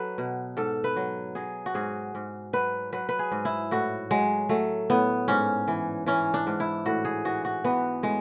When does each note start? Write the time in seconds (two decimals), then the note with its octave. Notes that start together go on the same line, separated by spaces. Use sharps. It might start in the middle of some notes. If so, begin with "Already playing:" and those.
Already playing: F#3 A4 B4
0.18 B2
0.57 G#2 A4
0.84 B4
0.96 F#3
1.35 F#3 G#4
1.66 F#4
1.74 G#2 G#4
2.15 G#2
2.53 F#3 B4
2.92 F#3 B4
3.09 B4
3.19 G#4
3.32 G#2
3.45 E4
3.71 A2 F#4
4.11 F#3 G#3
4.49 F#3 A3
4.90 A2 B3
5.28 G#2 C#4
5.68 E3
6.06 E3 C#4
6.34 D4
6.47 G#2
6.60 E4
6.86 A2 F#4
7.05 G#4
7.25 E3 F#4
7.45 F#4
7.64 E3 B3
8.03 A2 G#3